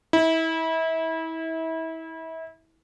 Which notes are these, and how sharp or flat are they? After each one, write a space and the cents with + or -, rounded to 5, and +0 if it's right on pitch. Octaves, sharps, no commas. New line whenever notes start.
E4 -30